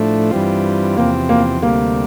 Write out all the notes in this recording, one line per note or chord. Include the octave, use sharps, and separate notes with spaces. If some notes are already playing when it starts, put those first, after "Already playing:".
Already playing: A2 F3 A3 D4
G2 E3 G3 C4 F4
E2 C3 F3 A#3 C4
A#3
D2 C3 G3 A#3